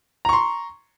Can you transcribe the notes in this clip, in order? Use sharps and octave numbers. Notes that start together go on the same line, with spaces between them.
A#5 C6 C#6